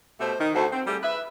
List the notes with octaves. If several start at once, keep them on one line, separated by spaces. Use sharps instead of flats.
B2 A3 G4 C5
D#3 D#4
D2 A3 F#4 C5
C4
G3 A3 G4 G#4
B4 E5